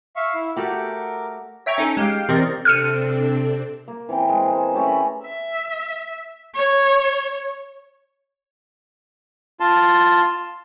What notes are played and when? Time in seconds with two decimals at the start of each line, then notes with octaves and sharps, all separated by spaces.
0.16 E5 F5 C#6
0.34 E4
0.56 A3 F#4 G4 A#4 D6
1.66 C#5 E5 G5 A#5 C#6
1.78 C#4 D#4 A4
1.97 G#3 G4 F5 G5
2.29 C3 E3 C4 A#4 D5 D#5
2.65 C3 C4 D4 A4 F6 C#7 D#7
3.88 A#3
4.09 E3 C4 A#4 G5
4.29 G#3
4.46 G#3 C5
4.74 A3 C#4 G4
4.87 A#5 B5
5.24 E5
6.54 C#5
9.60 F4 A5 C6